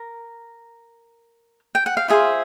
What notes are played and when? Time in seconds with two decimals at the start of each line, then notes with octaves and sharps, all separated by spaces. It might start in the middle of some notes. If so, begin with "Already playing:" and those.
Already playing: A#4
1.75 G5
1.86 F#5
1.97 F5
2.08 F4 G#4 C5 E5